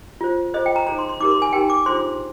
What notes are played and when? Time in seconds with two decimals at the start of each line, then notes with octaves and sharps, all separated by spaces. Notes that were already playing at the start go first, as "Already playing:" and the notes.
0.21 F4 C5
0.54 F4 G#4 C5 D#5
0.66 G5
0.76 A#5
0.87 D#4 G#4 C5 A#5
0.98 C6
1.09 C6
1.20 D#4 G4 A#4 D6
1.31 C6
1.42 G#5
1.53 D#4 G4 A#4 G5
1.70 D6
1.86 D4 F4 G#4 C5 C6